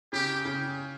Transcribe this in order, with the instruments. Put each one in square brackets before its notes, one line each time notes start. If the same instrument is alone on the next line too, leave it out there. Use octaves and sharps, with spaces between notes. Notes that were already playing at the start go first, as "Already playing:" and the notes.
[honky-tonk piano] C#3 [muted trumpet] G4
[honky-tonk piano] C#3